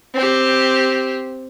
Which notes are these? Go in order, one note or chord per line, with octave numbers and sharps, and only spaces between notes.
C4 G4